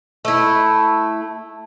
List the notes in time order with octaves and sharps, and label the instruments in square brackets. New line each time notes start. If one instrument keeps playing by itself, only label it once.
[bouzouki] A3 E4